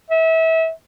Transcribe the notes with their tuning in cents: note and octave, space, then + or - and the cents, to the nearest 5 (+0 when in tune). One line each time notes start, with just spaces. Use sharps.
E5 -30